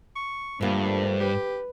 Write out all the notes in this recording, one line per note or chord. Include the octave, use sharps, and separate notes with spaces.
C#6
G2 D3 F3 G3 A3 A#3
G4 B4